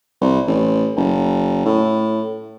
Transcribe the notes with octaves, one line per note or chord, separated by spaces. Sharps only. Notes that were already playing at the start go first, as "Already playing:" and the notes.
C2
A1
F#1
A2